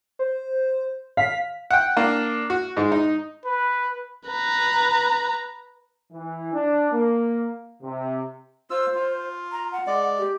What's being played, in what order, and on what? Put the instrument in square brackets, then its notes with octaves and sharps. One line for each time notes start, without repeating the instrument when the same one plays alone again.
[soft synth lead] C5
[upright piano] F5 [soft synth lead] B6
[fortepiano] F#5 G5
A#3 D4
F#4
G#2 G#3
D#4
[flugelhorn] B4
[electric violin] B4 A#5
[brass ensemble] E3
D4
A#3
C3
[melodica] F4 E6 [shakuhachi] C5
[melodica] F4
[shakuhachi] A#5
F#5
[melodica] G#3 D5
[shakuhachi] G4